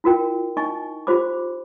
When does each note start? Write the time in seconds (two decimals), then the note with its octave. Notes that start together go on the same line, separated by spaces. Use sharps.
0.04 E4 F4 A#4 G5
0.57 D#4 D#5 G#5 C#6
1.07 F4 G4 C5 B5 D6